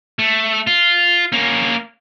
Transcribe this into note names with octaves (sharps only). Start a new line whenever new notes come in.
A3
F4
A#3 C#4